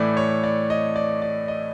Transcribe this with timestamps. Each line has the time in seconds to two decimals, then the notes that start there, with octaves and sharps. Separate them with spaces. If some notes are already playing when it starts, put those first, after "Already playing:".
Already playing: A2 E3 A3 D5
0.17 C#5
0.44 D5
0.70 D#5
0.96 D5
1.22 D5
1.48 D#5